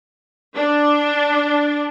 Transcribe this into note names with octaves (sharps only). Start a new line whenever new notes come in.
D4